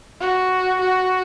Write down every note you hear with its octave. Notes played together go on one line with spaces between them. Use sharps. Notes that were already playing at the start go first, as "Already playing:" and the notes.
F#4
F#4